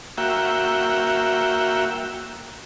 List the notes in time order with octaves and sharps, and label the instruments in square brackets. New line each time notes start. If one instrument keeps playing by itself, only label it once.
[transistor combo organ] A#3 F#4 E5 G5